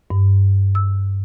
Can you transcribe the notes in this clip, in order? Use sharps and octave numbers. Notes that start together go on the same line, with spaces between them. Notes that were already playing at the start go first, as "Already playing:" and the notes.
G2
E6